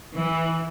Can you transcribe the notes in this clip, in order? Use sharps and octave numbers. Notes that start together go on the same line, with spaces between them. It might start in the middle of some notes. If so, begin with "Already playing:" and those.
E3